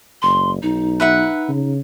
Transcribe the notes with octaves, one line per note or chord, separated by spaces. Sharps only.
F#1 C6
B1 D#4
B4 E5 F#5
C#3